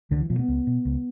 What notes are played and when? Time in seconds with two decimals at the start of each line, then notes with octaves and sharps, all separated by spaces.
0.11 C#2 D3
0.21 E3
0.30 B2 F3
0.39 B3
0.48 C#2
0.67 B2
0.85 C#2